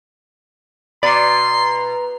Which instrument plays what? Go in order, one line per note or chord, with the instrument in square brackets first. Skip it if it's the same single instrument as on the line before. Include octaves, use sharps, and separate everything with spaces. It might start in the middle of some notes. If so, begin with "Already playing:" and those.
[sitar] B2 [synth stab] D5 [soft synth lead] A#5 [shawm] C6